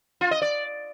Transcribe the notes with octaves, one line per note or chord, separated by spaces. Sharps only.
F4
D#5
D5